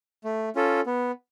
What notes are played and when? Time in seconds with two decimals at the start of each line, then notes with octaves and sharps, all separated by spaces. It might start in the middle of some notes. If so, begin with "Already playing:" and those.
0.24 A3
0.56 C#4 F4 A4
0.86 B3